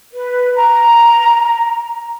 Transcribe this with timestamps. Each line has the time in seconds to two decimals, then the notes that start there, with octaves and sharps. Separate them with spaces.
0.12 B4
0.54 A#5